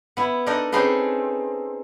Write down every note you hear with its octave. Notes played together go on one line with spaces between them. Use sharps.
B3 E4
D4 D#4 A4 A#4 D5 D#5
C4 C#4 D#4 G#4 A4 B4